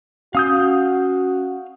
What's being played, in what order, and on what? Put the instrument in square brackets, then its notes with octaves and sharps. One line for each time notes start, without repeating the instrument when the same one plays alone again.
[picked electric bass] C#4 [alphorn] F#4 [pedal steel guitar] F5 D#6 G6